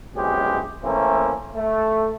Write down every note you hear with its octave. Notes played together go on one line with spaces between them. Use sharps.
A#1 F#2 B2 G#3 C#4 G4
E3 A3 A#3 C4 C#4
A3